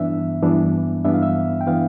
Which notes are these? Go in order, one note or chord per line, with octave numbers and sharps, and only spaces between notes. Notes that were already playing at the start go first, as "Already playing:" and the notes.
Already playing: G2 E3 B3 D4 E5
G2 E3 B3 D4
G2 E3 B3 D4 E5
F5
E5
G5
E3 B3 D4 F5